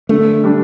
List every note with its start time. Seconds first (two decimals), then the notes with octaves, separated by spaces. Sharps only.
0.09 D3 A3
0.44 G3 D4